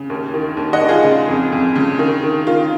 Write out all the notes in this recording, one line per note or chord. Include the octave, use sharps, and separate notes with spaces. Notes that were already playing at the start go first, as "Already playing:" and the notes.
Already playing: C#3
D#2
D#3
D#2
D#5 F#5
D#2
F4 G#4
C#3
F2
F2
C#3
D#3
D#3
D#3 F4